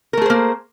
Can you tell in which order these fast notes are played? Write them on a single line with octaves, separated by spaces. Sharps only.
A#4 A3 G#4 C5 A#3